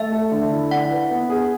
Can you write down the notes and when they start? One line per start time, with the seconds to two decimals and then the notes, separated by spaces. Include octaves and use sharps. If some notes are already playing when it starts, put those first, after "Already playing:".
Already playing: A3 E5
0.12 A4
0.32 D3
0.51 E4
0.71 D4 F#5
0.91 B4
1.10 B3
1.30 G#4